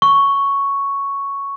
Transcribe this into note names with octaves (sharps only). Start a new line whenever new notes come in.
C#6